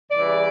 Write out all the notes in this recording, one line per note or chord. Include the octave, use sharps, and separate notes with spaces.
C#3 E3 G3 D5